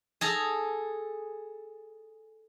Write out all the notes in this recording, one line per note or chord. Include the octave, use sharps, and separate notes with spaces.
G#4 A4 A#5